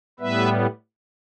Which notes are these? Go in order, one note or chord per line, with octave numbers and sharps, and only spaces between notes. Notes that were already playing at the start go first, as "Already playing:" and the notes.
A2 G3 B3 B4 E5